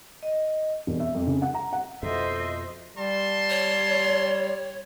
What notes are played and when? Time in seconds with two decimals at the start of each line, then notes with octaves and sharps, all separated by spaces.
0.23 D#5
0.87 E1
1.00 E5
1.15 F2
1.27 C#3
1.42 F#5
1.54 A#5
1.73 F#5
2.03 F2 B2 A4 C5 D#5 E5
2.97 G3 A5 C6
3.50 C#5